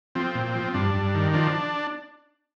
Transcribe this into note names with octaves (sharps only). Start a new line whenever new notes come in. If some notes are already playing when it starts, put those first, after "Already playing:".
F3 C4
A#2
F3
G2 D4
G2
D#3
F3 D4